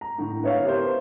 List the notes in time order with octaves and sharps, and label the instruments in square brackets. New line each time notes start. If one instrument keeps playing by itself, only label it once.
[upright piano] A#5
A2 D3
B3 E4 C#5 E5 F5
G4 A#4 C5